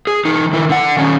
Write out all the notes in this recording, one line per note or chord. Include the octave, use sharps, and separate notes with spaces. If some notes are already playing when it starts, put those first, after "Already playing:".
G#4
E3 D#4
D#3 E4
D3 F#5
D#3 C#4